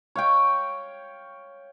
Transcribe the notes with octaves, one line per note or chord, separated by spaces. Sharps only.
C#5 F5 G5